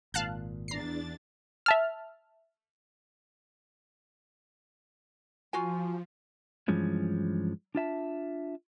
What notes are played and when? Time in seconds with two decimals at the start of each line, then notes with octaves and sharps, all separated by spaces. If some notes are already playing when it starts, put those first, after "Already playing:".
0.14 G#1 A#2 F5 A5 F#6
0.68 E2 D4 A#5 A6 C7
1.66 E5 A5 F6
5.53 F3 F4 F#4 G#5
6.68 G2 E3 F3 G#3 C#4
7.75 D4 F4 E5 A5